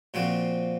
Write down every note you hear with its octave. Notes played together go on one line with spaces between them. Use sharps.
A#2 F3 C4 F#4